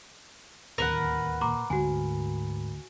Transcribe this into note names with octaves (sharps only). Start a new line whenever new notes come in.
D1 D#2 A#4 B4 F#5
A#2 A#5 C6 D6
D2 G#2 F#4 G#5